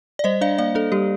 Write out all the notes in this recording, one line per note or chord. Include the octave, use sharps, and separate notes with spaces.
D5
G3 C5 D#5
D4 D5 F5
A#3 D5 F5
D4 A4
G3 G4